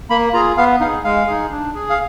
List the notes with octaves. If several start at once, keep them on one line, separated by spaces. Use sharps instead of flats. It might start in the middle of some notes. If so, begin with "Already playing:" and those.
A#3 B5
F4 G#4 A#5
B3 F5
D#4 G#4 F5
G#3 F5
D#4 G#4
D4
G#4
F5